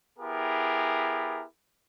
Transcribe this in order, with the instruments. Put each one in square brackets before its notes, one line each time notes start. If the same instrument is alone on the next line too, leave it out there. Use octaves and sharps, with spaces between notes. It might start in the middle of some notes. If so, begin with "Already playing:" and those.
[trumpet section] B3 E4 G4 G#4 A#4